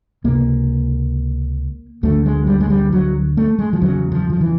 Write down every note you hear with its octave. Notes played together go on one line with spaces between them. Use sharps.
C#2 C3 A#3
D2 D3 A3
G#3
G3
G#3
G3
F#3
A3
G#3
F3
E2 C#3 F#3
F3
F3
E3